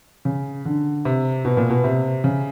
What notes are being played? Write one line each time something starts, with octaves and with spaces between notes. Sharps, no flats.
C#3
D3
C3
B2
A#2
B2
C3
C#3